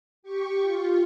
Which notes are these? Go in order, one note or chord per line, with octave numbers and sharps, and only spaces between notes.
G4 C#6
F4